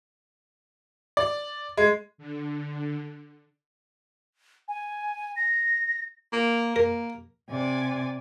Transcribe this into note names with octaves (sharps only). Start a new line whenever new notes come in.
D5
G#3
D3
G#5
A#6
A#3
A#3 A#4
C3 D5 G#5